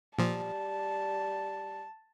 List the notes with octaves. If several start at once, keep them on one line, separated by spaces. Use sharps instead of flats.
A#2 F3 G3 A5